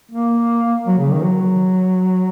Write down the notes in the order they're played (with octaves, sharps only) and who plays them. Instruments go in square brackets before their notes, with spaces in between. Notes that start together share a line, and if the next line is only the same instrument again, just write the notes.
[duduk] A#3
F#3
C#3
D#3
F#3